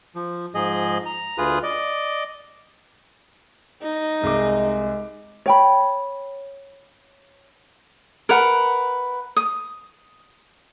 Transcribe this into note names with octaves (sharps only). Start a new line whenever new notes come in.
F3
G#2 F3 G#4 D#5
A#5
D2 F4 G#4 B4 D#6
D5 D#5
D#4
C2 G#3 G#4 D6
C#5 G5 B5
A#4 B4 F#5
D#6